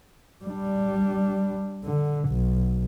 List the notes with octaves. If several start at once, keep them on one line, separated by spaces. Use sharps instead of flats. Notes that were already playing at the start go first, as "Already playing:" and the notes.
G3 D4
D3
B1